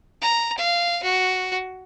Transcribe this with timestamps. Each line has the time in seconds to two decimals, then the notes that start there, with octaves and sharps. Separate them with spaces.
0.21 A#5
0.58 F5
1.03 F#4